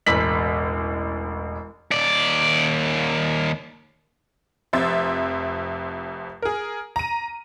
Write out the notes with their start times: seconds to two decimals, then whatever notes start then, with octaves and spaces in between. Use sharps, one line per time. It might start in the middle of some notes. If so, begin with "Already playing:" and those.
0.06 E1 A1 B6 F#7
1.91 D#2 D5
4.73 F1 F2 C4 E5 C6 A6
6.42 G#4 A#4
6.96 A#5 D#7